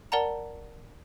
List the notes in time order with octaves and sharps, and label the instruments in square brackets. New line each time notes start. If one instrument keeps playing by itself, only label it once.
[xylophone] A#4 D5 F#5 A5 A#5